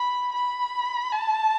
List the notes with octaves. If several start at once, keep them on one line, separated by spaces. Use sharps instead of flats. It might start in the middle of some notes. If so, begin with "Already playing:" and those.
Already playing: B5
B5
A5